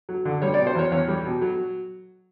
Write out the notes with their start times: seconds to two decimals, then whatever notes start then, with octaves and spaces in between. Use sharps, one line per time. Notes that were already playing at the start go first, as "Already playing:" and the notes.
0.09 F#3
0.25 D3
0.42 G3 C#5
0.54 D5
0.59 B2
0.67 C5
0.75 E2 C#5
0.92 E2 C#5
1.08 G3
1.25 B2
1.42 F#3